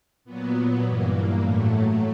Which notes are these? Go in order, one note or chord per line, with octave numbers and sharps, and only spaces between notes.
A#2 F#3 B3
G2 E3 A#3
A#3
A2 F#3 A3